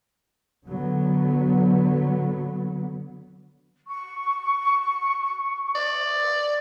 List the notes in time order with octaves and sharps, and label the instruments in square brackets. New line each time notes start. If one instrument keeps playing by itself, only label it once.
[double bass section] D3 F#3 B3
[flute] C#6
[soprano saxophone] D5